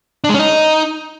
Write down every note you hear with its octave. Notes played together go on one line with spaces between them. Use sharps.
D4
G#3
C#4
D#4